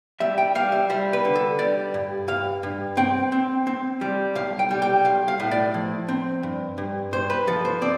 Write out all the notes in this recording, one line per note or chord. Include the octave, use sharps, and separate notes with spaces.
G3 E5
G5
G3 F5
E5
G3 C5
B4
D3
A4
G3 D5
G2
G2 F5
G2
C4 G5
C4
C4
G3
B1 F5
G5
G3
G5
B1 F5
F5
A2
D5
F3
C4
G2
G2
G2 C5
B4
F3 A4
C5
C4 D5